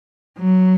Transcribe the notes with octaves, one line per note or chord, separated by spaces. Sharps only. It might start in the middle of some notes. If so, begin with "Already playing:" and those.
F#3